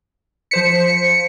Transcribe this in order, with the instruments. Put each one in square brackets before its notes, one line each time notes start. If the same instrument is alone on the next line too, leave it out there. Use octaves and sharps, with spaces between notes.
[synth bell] F3 C5 B6 [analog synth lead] C#7